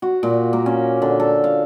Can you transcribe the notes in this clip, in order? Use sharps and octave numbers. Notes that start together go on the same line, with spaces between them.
F#4
A#2
A#3
C#4
D3
A4
F5